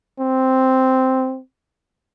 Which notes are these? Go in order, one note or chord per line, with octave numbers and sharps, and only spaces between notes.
C4